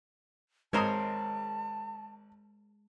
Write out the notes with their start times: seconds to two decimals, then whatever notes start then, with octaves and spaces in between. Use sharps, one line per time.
0.73 G#1 G#3 A#4 C5 C#5 A5 A#5 D#6